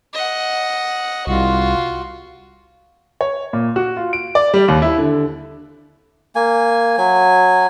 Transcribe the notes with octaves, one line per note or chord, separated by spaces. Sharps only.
D#5 F#5
C2 F4 F#4
C#5
A#2
F#4
F4
D7
D5
G3
D#2
E4
D3
A#3 G#5
F#3 G#5